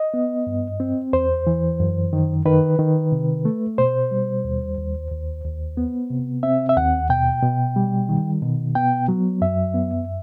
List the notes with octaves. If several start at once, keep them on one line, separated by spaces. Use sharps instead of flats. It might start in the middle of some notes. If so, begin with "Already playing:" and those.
Already playing: D#5
B3
G2
C4
E2 C5
E3
F#2
D#3
D#3 B4
D#3
C3
A3
B2 C5
G3
D#2
D#2
D#2
D#2
B3
C3
C4 E5
E5
D#2 F#5
B2 G5
B2
G3
D#3
B2
B3 G5
F#3
F#2 E5
B3